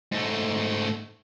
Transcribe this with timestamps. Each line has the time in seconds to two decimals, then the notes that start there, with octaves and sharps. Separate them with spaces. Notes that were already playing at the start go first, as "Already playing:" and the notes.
0.12 G#2 A3